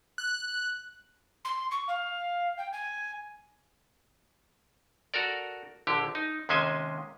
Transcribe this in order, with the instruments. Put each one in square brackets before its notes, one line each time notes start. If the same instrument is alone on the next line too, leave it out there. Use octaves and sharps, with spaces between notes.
[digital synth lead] F#6
[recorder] C6
C#6
F5
G5
G#5
[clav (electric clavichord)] F#4 A4 A#4 D5
A#1 D3 G4
D#4
D#2 C3 G#3 C#4 C5 G#5